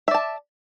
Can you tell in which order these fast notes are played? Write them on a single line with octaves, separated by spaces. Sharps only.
E5 D5 A5